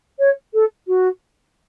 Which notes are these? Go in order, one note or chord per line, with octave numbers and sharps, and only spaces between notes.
C#5
A4
F#4